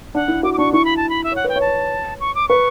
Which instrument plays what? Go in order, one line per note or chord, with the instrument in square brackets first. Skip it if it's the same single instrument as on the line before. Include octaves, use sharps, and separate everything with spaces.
[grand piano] D4 [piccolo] F#5
[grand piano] E4
[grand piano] F#4 [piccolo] D6
[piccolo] D6
[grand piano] D4 [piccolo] C#6
[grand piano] E4 [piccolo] C#6
[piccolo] B5
A5
B5
E5
[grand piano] C#5 [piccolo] F#5
[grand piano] B4 [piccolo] G5
[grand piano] C#5
[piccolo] A5
C#6
D6
[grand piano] B4 [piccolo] C#6